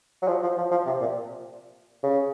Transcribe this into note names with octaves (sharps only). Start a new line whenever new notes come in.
F#3
F3
F3
F3
F3
C3
A#2
C#3